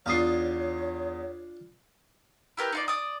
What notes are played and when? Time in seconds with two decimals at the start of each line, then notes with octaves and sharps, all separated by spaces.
0.06 E2 D4 F4 C#5 F5 D#6 C7
2.57 E4 G4 A#4 B4
2.72 D#4 F4 D5
2.88 D5 D#6